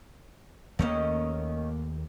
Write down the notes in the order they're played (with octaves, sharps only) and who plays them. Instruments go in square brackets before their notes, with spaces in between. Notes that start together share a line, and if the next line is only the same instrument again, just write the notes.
[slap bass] D#2 A3 A#3 [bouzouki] D#3 C#4 D#5